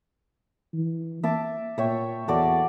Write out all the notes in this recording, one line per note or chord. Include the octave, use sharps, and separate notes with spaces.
E3
A#3 E5 A5 D6
A#2 C#5 E5 G5
E2 F#4 A4 D5